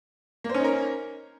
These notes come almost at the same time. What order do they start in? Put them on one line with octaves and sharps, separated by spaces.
A#3 C5 C#4 D#4 A#4